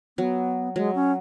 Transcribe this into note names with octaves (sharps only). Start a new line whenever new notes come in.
F#3 B3
F#3 G#3
C#4